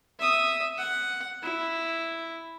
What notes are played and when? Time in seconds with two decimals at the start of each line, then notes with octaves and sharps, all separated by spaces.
0.19 E5 D#6
0.77 F#5
1.42 E4